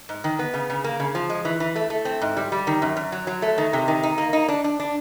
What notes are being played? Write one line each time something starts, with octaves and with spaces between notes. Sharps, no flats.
G#2
D#3
B3
C#3
C#3
A#3
C#3
F3
G#3
E3
E3
A3
A3
C4
G#2
G3
G3
D#3
F#2
F#2
F#3
F#3
A3
D#3
C3
D#3
D#4
A#3
D#4
D4
D4
D4